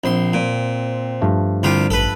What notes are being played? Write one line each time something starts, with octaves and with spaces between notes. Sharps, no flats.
A#1 C4 C6
A#2
G2 F3 A3
C2 D3 F4 G4
A1 A4 B4